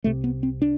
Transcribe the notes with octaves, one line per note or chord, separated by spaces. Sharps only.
C2 C3 A3
B3
C4
D4